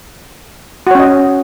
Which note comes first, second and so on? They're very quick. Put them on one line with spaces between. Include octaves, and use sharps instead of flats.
F#4 C#5 C#4 D#5